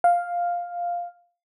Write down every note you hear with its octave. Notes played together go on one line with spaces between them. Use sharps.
F5